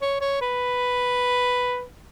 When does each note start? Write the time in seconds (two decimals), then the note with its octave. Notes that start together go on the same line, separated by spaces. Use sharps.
0.02 C#5
0.21 C#5
0.41 B4